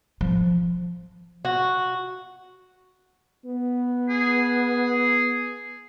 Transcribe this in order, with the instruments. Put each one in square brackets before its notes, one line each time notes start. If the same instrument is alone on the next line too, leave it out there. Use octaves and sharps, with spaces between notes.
[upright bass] F3
[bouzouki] F#4
[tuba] B3
[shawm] G#4